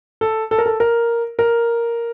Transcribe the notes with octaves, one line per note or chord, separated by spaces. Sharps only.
A4
A4
A#4
A4
A#4
A#4